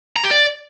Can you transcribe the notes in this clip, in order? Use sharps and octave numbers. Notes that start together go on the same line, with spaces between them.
A#5
G4
D5